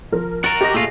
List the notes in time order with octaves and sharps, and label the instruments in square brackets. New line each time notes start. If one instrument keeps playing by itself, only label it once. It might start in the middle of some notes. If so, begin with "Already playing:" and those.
[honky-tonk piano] F3 A#4
[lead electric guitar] F#4 A#4 [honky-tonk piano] A6
[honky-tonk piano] G4 D#5 A#6
[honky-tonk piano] A#2 G#4 [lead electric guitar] A3 F4